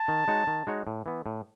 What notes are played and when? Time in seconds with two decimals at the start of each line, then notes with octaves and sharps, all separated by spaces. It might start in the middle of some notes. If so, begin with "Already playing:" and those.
Already playing: A5
0.08 D#3
0.28 G#3 D#4 F#4 C#5
0.47 D#3
0.67 G#3 D#4 F#4 C#5
0.87 A2
1.06 E3 B3
1.26 A2